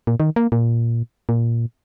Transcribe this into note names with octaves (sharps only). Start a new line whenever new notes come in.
A#2
D#3
A#3
A#2
A#2